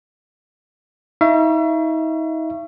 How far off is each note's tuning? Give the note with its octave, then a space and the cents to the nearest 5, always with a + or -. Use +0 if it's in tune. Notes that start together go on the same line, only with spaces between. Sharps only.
D#4 +40 E5 +40 C#6 +0